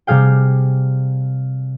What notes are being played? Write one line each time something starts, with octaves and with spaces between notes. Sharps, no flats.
C3 G3 G#4 F5 G5